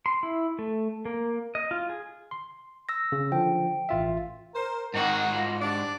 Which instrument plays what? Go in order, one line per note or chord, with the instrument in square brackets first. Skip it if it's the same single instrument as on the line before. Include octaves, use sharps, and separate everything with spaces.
[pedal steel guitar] C6
E4
A3
A#3
D#5
F4
G#4
[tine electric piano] C6
[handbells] E6 A#6
[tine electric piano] C#3
[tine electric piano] D3 F3 [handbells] G5
[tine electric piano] A1 F4 E5
[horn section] A#4 C5
[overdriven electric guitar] G#2 F#4 [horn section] D#3 [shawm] A#5
[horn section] F4
[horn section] G3 D4 [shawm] D5